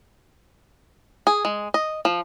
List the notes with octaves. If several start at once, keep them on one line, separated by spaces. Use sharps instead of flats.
G#4
G#3
D#5
F3